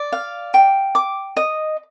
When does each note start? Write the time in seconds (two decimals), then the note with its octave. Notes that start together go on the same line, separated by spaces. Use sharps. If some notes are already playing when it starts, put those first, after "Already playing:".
Already playing: D5
0.12 F5
0.54 G5
0.95 D6
1.37 D#5